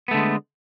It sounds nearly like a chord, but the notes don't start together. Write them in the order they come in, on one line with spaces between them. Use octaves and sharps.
B3 A3 D3 G#3